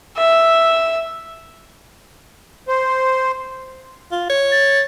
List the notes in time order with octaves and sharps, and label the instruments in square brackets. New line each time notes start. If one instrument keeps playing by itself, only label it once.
[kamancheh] E5
[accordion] C5
[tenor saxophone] F4
C#5
[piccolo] A6